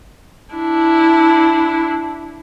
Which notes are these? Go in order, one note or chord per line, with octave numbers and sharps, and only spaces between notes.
D4 E4